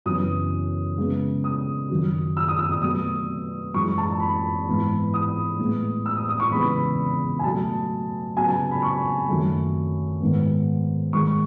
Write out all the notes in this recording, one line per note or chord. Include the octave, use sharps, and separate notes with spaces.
F#2 C#3 E3 B3 D#6
C#3 G#3 B3
D#6
F#2 D#3 F#3
E6
D#6
E6
D#6
B2 F#3 A3 D#6
F#2 E3 G#3 C#6
A5
A5
B5
G#2 E3 B3
D#6
A2 G#3 B3
E6
D#6
D#6
C#6
E2 C#3 E3 G#3 B3 B5
G#5
B2 F#3 A3 A5
C#3 F#3 B3 G#5
A5
B5
C#6
F#2 D#3 F#3 A3
G#2 D#3 G#3 B3
G#2 D#3 G#3 C#6